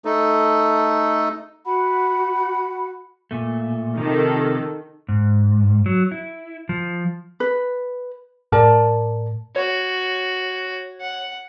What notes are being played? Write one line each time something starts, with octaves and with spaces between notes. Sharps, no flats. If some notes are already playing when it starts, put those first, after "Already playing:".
A3 D#4 A4
F#4 F#5 B5
A#2 A3
C3 D#3 F3 A4
G#2
F#3
E4
F3
B4
A2 A#4 D5 A5
F#4 C#5
F#5